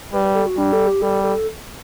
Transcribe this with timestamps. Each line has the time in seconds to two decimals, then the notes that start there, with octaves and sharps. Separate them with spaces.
0.13 G3 B4
0.25 B4
0.35 A4
0.46 F#4
0.57 G3 D4
0.73 A4
0.87 G4
1.02 G3 A4
1.24 A4